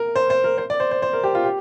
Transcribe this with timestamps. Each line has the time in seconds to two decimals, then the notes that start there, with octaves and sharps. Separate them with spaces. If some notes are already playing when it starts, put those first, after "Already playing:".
Already playing: A#4
0.15 C5
0.30 C5
0.44 A#4
0.58 C5
0.70 D5
0.80 C5
0.91 C5
1.02 C5
1.13 A#4
1.24 G4
1.35 F4
1.44 G4